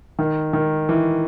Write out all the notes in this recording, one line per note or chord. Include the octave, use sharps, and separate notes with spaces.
D#3
D#3
E3